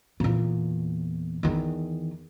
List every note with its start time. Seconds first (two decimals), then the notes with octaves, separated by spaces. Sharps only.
0.20 E2 A#2
1.43 E2 D#3